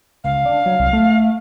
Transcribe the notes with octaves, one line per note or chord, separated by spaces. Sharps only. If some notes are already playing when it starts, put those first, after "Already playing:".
C#2 F5
D4
F#3
C2
A3